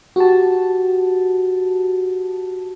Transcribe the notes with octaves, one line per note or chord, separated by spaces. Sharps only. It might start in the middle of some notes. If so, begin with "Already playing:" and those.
F#4 G4 A5